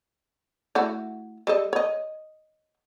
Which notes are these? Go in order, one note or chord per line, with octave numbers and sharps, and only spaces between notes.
A3 E4 F#4
G3 A4 D#5
C#5 D#5